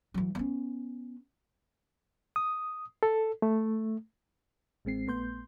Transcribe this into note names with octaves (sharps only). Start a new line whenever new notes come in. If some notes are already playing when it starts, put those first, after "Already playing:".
E3 F#3
B3 C#4
D#6
A4
A3
A1 G#3 C4 C7
A#1 A3 B3 C6 G6